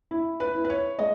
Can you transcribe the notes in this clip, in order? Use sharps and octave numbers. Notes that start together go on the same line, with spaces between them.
E4
B4
E4
B4
C#5
G#3 D#5